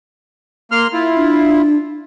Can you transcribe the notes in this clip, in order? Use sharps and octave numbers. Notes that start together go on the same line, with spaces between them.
A#3 C6 F6
E4 F4
D4